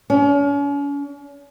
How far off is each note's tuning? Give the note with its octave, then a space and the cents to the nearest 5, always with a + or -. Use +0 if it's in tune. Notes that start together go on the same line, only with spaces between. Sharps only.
C#4 +40